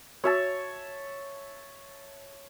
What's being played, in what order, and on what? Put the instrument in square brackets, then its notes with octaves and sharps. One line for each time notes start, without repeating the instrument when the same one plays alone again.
[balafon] F#4 [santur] C#5 E5 A5